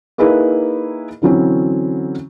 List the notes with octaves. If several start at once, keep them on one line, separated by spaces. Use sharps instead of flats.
A#3 D#4 E4 G#4 B4
D3 E3 F#3 C4 C#4